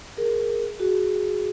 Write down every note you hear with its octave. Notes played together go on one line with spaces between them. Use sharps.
G#4 A#4
F#4 G#4